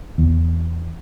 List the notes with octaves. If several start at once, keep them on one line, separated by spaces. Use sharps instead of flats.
E2